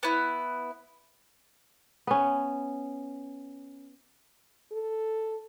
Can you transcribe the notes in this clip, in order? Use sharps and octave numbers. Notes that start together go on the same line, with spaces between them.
B3 E4
B3 C#4
A4